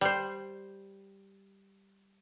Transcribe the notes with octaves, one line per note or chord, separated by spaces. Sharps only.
G3 C5